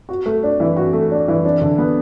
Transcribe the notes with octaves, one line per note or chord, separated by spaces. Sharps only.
F#4
A3
D4
E3
F#4
A3
D4
E3
D4
D3
B3